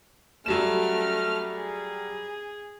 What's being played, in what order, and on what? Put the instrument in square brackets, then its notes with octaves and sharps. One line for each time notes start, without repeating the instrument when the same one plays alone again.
[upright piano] F#3 G3 E7 [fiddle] A3 F6
[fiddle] G#4